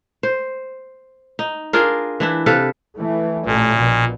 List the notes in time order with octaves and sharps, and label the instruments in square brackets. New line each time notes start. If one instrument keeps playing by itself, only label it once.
[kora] C5
D#4
D4 F4 G#4 A#4
E3 D4 E4
C3 A4 B4 F5
[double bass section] E3 A3
[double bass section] A1 A3 [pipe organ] A#2
[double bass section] A#1 B2